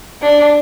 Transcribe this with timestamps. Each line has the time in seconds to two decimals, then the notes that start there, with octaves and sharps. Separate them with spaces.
0.22 D4